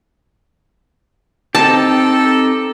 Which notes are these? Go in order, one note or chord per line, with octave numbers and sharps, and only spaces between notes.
C4 D#4 G4 A4 A5